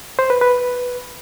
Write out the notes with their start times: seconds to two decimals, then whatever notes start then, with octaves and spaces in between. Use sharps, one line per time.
0.19 C5
0.30 B4
0.41 B4